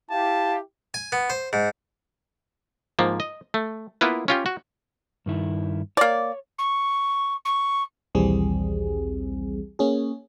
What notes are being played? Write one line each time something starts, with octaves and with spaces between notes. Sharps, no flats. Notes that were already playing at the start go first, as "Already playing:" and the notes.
E4 G4 F5 A5
G#5
B3
C5
G#2
G#2 F3 A#3
D#5
A3
A#3 B3 E4 F4 B4
C#4 F4 G4
F#4
G2 D#3 E4
A#3 C#5 D5
C#6
C#6
A#1 D#2 E3 G3 C4 G#4
A#3 C#4 G#4